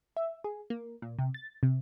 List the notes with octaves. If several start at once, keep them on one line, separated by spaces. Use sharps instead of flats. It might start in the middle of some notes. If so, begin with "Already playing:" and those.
E5
G#4
A#3
A#2
C3
A6
C3